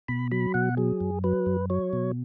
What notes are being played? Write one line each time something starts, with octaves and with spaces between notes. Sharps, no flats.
B2 B5
F#3 B5
B2 F#5
F#3 G#4
F#2
F#3 B4
F#2
F#3 C#5
B2